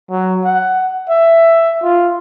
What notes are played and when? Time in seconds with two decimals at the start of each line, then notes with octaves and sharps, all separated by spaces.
0.11 F#3
0.44 F#5
1.10 E5
1.83 F4